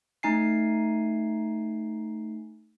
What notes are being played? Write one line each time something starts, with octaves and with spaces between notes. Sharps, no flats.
A3 D#4 G#5 C7